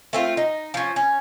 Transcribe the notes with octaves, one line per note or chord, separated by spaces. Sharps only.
A3 C4 F4
D#4
F3 C#4
C#4